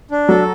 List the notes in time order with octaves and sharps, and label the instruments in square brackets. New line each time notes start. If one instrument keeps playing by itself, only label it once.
[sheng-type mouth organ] D4
[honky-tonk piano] F#3 [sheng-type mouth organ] A4